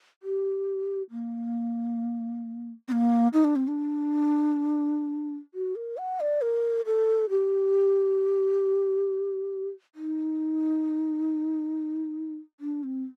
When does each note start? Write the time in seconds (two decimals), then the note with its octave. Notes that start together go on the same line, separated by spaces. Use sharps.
0.23 G4
1.11 A#3
2.88 C4
2.92 A#3
3.33 D#4
3.44 D4
3.56 C4
3.68 D4
5.54 F#4
5.76 A#4
5.97 F#5
6.20 D5
6.42 A#4
6.86 A4
7.30 G4
9.95 D#4
12.60 D4
12.84 C4